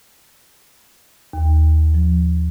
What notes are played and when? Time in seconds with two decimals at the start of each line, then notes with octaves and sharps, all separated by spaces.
1.33 D#2
1.94 F3